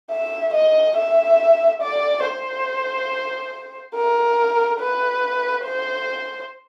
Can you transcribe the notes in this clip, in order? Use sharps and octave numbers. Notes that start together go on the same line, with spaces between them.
E5
D#5
E5
D5
C5
A#4
B4
C5